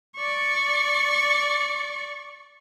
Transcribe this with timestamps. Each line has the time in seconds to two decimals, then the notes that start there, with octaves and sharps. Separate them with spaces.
0.16 D5 C#6